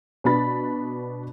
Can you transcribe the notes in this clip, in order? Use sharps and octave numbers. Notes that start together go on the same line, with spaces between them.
B2 B3 D4 B5 A6